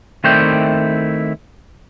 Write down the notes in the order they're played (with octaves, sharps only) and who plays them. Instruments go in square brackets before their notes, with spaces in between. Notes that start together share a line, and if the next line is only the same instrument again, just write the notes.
[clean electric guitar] D#3 A3 C4 E4 D5 G5